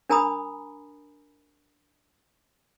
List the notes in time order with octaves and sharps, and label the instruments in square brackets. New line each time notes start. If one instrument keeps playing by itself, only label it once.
[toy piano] D4 A#4 G#5 A#5 B5 D#6